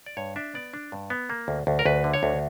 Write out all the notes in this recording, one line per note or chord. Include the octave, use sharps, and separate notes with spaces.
D5
G2 C#5
D4 E5
B3 D5
D4
G2
B3
A#3
D2
D2
A#4
D2 B4
D3
C#5
D2